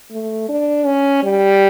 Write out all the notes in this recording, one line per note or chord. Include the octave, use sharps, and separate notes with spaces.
A3
D4
C#4
G3